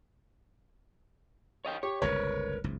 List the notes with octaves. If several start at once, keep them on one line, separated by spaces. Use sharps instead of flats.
C#5 D#5 G5
G4 C#5
G1 C#2 C3 A#4 B4 C#5
F#1 C#2 G#2